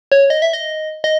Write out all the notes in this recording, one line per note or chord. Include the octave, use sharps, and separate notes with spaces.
C#5
D#5
E5
D#5
D#5